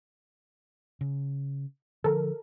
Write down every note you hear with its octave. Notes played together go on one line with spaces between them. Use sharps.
C#3
D3 F3 A4 A#4